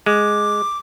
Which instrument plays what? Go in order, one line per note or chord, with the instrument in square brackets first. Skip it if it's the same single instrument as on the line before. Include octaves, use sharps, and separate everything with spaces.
[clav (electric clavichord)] G#3 [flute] D6